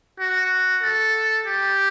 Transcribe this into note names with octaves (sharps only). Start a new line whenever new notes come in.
F#4
A4
G4